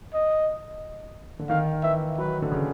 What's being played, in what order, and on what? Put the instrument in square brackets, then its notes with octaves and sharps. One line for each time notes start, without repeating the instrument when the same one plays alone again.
[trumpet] D#5
[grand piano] D3
[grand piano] D#3 [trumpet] F5
[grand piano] E3 [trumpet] E5
[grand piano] F#3 [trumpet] B4
[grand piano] D3
C#3